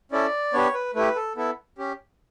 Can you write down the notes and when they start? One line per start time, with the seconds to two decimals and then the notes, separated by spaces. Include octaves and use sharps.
0.12 C#4 E4 A4 D5
0.53 B3 D4 G4 C#5
0.74 B4
0.94 A3 E4 G4 B4
1.16 A4
1.36 B3 E4 A4
1.78 C#4 G4